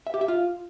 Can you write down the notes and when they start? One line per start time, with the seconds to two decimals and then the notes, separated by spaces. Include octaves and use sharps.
0.07 E5
0.14 G4
0.21 E5
0.28 F4